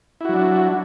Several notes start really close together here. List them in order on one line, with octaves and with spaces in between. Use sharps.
E4 F#4 F#3 D4